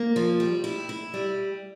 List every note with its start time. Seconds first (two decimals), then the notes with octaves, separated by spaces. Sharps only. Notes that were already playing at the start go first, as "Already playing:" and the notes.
Already playing: A#3
0.16 F3
0.40 G3
0.64 E4
0.89 E4
1.14 G3